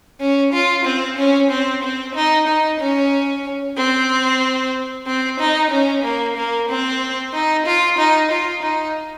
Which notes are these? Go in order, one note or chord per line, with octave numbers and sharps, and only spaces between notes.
C#4
F4
C4
C#4
C4
C4
D#4
D#4
C#4
C4
C4
D#4
C#4
A#3
A#3
C4
D#4
F4
D#4
F4
D#4